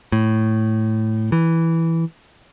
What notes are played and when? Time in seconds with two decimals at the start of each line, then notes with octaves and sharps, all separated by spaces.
0.12 A2
1.32 E3